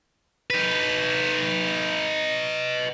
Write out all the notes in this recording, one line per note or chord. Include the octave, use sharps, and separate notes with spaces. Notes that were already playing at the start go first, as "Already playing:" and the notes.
D#4 B4